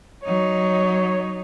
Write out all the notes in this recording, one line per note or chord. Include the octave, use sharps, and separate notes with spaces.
F#3 D#4 C#5